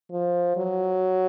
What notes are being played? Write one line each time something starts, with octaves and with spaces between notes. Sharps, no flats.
F3
F#3